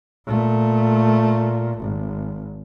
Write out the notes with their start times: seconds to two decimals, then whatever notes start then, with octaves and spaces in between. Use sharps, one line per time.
0.26 A#2 A3
1.79 G#1